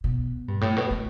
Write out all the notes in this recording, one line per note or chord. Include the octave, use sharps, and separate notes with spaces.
B2
G2
A2
B2
A3